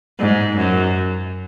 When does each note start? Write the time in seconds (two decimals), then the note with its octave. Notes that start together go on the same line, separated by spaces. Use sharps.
0.19 G#2
0.57 F#2